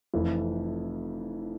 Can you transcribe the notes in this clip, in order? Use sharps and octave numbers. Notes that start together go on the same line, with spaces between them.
F1 F2 E3